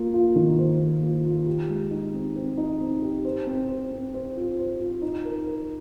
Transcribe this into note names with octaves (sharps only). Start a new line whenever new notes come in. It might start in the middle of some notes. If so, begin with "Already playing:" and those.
Already playing: A#3 F4
F4
D#3
C5
A#3
F4
F4
G4
G#3
D#4
C4
C4
D#4
C4
G4
C5
C4
C5
C4
C5
F4
C5
F4
D#4
A#4
A#4